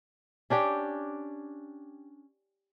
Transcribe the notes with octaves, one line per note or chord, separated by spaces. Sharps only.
C#4 D4 G4 G5